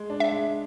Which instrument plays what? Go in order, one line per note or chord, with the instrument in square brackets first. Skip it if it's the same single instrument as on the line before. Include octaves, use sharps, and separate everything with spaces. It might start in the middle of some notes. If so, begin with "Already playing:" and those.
Already playing: [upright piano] G#3
D4
[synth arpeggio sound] E5
[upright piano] G#3